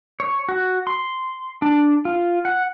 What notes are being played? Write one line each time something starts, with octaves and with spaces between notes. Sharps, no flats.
C#5
F#4
C6
D4
F4
F#5